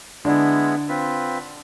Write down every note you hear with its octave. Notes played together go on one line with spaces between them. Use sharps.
D3 G#3 B3 D4 E4
C4 F4 B4